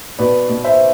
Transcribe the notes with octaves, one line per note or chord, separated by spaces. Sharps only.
B2 B4 D5
B2
C5 E5